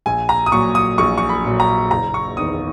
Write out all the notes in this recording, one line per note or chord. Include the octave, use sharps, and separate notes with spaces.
A#1 G#5
A#5
D#6
A#2 F#3 C#6
D#6
A#1 C#6
C#6
B5
A#2 F#3
A#5
F#1 A#5
C#6
E2 D#3 D#6